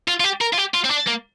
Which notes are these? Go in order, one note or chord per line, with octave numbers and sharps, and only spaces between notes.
F4
F4
G4
A#4
F4
G4
F4
C4
D4
A#3